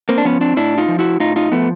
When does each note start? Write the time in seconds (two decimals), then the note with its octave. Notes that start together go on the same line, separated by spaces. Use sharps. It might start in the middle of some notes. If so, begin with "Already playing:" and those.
0.09 A#3 C4
0.18 D4
0.25 F3 B3 C#4
0.41 C4 D4
0.56 A2 D4 E4
0.78 D#4 F4
0.88 F3
0.99 E4 F#4
1.20 A2 D#4 F4
1.36 D#4 F4
1.52 F3 A3 B3